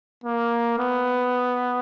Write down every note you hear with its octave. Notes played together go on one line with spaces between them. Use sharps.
A#3
B3